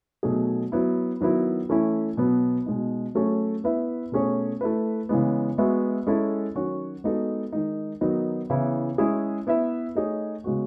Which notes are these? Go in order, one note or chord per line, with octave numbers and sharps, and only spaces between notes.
B2 F#3 A3 D#4 G#4
F#3 B3 E4
D#3 F#3 B3 E4
E3 A3 C#4 E4
B2 F#3 B3
B2 G#3 D#4
F#3 A3 C#4 G#4 C#5
B3 E4 B4 E5
B2 A3 C#4 G#4 C#5
A3 E4 B4
C#3 E3 G#3 B3
G#3 B3 F#4 B4 E5
G#3 C#4 E4 A4
D#3 F#3 C#4 F#4 C#5
G#3 B3 D#4 F#4 A4
D#3 G#3 D#4
D#3 F#3 B3 D#4
C#3 E3 B3 E4
G#3 C#4 E4 G#4
B3 E4 B4 E5
A3 D#4 G#4 C#5
C#3 G#3 B3 F#4